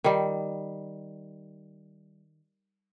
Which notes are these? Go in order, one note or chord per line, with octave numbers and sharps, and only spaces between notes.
D#3 G3